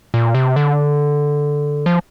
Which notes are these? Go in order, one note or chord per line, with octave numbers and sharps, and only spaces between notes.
A#2
C3
D3
F3